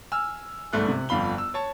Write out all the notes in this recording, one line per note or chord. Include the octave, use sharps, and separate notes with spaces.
G#5 E6 F6
G1 C2 G#2 A3 F#6
C3
G1 F2 F5 B5 G7
E6
C#5 A5